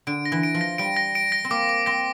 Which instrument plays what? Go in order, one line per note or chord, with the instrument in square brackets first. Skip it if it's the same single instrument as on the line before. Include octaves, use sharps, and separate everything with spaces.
[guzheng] D3 [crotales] D7
[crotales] A#6
[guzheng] E3
[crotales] D7
[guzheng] F3
[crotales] A#6
[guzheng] G3 [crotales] D7
[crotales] A#6
D7
A#6
[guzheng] C4
[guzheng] A#3 [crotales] D6
[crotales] D6
[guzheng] C4 [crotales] A#6